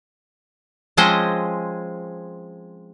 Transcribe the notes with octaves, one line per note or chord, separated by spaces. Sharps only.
F3 G#3 C4 C#4 C5 D#5